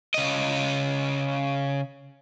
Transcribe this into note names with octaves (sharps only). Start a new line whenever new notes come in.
C#3 D#5